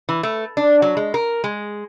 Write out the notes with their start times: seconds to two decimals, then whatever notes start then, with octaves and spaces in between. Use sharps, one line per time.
0.09 E3
0.23 A3
0.57 D4
0.82 F#3
0.97 G#3
1.14 A#4
1.44 G#3